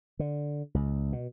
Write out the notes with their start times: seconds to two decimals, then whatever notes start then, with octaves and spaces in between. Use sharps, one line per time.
0.19 D3
0.74 C#2
1.13 B2